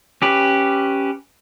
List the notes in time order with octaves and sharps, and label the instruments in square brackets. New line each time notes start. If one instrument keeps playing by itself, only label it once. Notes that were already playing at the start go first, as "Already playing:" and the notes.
[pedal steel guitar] C#4 G4 B4